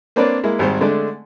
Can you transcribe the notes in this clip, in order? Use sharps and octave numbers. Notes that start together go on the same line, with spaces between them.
A#3 C4 D4 B4 C#5 D5
G#3 A#3 E4
G#1 G3 G#3 C5
D3 G#3 A3 D4